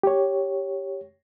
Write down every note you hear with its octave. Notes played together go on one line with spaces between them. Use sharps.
G4 C#5